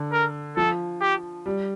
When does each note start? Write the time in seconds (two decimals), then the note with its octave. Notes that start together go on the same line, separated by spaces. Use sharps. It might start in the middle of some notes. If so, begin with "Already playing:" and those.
Already playing: D3
0.12 A#4
0.56 F3 A4
1.01 G4
1.46 G3